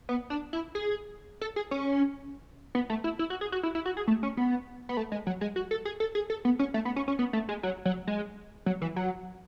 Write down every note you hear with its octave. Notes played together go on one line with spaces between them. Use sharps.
B3
D4
E4
G#4
A4
G#4
C#4
B3
A3
E4
E4
F#4
G#4
F#4
E4
E4
F#4
G#4
A3
C#4
B3
B3
A3
G#3
F#3
G#3
F#4
A4
G#4
A4
G#4
A4
B3
C#4
A3
B3
C#4
C#4
B3
A3
G#3
F#3
F#3
G#3
F#3
E3
F#3